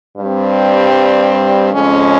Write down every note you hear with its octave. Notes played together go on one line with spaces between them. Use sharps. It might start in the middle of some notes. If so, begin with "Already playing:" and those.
G2 G3 C4
F2 C#3 G#3 C#4